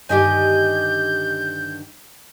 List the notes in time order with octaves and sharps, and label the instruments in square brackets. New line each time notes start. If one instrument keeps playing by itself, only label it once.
[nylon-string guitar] G2 D3 D#3 [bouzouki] G4 D#5 G#5 [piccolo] G6